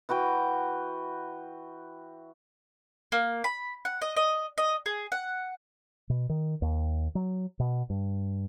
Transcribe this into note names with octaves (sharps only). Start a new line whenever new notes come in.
E3 F#4 B4 G5
A#3
B5
F#5
D#5
D#5
D#5
G#4
F#5
B2
D#3
D#2
F#3
B2
G2